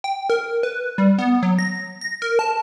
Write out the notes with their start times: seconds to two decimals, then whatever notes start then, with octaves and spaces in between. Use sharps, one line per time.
0.04 G5
0.30 A#4
0.63 B4
0.98 G3
1.19 B3
1.43 F#3
1.59 A#6
2.01 A#6
2.22 A#4
2.39 A5